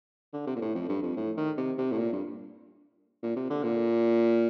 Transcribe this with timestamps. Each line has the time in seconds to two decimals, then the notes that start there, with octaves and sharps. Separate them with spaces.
0.33 D3
0.47 C3
0.56 A#2
0.61 A2
0.75 F2
0.89 G2
1.02 F2
1.16 A2
1.37 D#3
1.57 C3
1.78 C3
1.92 A2
1.98 A#2
2.13 G2
3.23 A#2
3.36 C3
3.50 D3
3.63 A#2